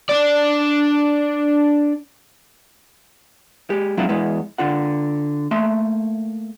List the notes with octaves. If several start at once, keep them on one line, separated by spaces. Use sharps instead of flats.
D4 D5
G#3 G4
F#3 G#3 C4 D4 E4 F4
E2 G#3 B3 E4
D3 F4 F#5
A3 A#3 E5 C6